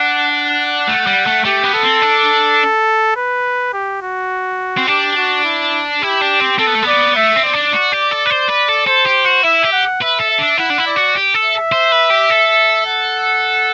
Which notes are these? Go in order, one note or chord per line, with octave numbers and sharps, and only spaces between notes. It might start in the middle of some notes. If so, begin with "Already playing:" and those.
Already playing: D4 F#5
F#5
A3
G3
A3
A3 G4
B3
A4
C4
D4
B4
G4
F#4
C4
D4 G4
F#4
E4
E4 G4
D4
C4
C4 A4
B3
A3
B3 D5
A3 E5
C4
D5
D4
F#4
G4
A4
B4
C5
B4
A4
A4 C5
G4
F#4
E4 E5
G4
F#5
B4 E5
A4
E5
D4
E4 F#5
D4
E4
D5
F#4
G4
A4
E5
C5
B4
G4
A4
F#5